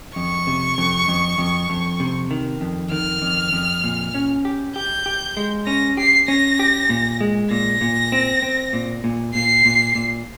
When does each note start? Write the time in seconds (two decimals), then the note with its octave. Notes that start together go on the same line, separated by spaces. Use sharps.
0.16 F2 C#6
0.47 C3
0.78 F2
1.08 F2
1.38 F2
1.70 F2
2.00 C3
2.31 D#3
2.61 F2
2.91 D#3 F6
3.22 F2
3.53 F2
3.84 A#2
4.14 C#4
4.45 G4
4.76 G4 G6
5.06 G4
5.37 G#3
5.67 C#4 A#6
5.97 G4 C7
6.28 C#4 A#6
6.59 G4
6.89 A#2
7.21 G#3
7.51 A#2 A#6
7.81 A#2
8.12 C4
8.42 C4
8.73 A#2
9.04 A#2
9.34 A#2 C7
9.65 A#2
9.95 A#2